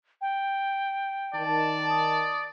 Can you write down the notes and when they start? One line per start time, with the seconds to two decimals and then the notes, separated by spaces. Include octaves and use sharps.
0.21 G5
1.34 D#3 D5 A5
1.90 D#6